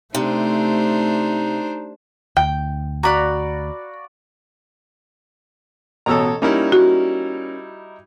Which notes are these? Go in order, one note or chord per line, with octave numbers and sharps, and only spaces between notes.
C3 A3 D4 D#4 C5
D2 G5
F#4 D5 F5 A#5 B5 F#6
A1 B2 A4 C#5 A#5 E6
G3 A#3 C#4 D#4 E4 A#4
F#4